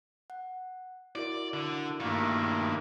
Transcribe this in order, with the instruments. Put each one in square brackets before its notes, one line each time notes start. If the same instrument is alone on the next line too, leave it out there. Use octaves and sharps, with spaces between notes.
[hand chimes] F#5
[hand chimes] E4 F#4 A#4 [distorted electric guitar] D5
[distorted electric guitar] D3
[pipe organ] G2 A#3 [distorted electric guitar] D#3 A3